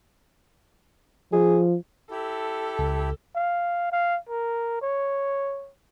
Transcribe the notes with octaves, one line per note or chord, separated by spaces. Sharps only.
F3 G#4
E4 G4 A4
C#2
F5
F5
A#4
C#5